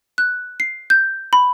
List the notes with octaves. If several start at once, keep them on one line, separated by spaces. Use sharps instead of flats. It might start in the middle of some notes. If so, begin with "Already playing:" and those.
F#6
C7
G6
B5